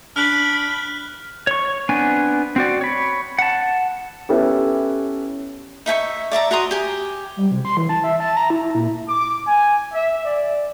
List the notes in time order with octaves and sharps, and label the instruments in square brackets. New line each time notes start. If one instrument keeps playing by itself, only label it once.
[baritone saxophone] D4 [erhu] B5 [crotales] F6 F#6 F#7
[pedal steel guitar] C#5 C#6
B3 C4 D4 G#5
C4 F#4 D5
C#5 B5
F#5 A5
[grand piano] B3 C#4 E4 G4 A4 B4
[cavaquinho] D#4 E5 G5 C#6
D5 E5 A5 A#5
F#4 A#5 C6 D#6
G4 G#5
[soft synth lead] G3
C3
C6
E3
A5
E5
A5
A#5
E4
E4
A#2
[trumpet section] D6
G#5
E5
D5